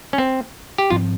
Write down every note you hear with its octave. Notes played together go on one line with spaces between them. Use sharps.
C#4
C4
G4
G#2 F3 C4 F4